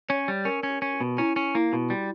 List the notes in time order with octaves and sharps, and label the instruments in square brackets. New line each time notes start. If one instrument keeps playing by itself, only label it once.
[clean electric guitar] C#4 [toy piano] C#5
[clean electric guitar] G3
[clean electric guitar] C#4 [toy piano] A#4
[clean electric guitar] C#4
[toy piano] G4
[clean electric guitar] C#4
[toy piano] F#4
[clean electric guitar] B2
[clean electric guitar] C#4 [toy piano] E4
[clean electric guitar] C#4
[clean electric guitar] A#3 [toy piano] E4
[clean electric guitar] B2
[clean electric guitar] G3 [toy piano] F#4